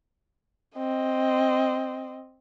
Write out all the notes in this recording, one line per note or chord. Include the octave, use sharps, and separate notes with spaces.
C4 D#5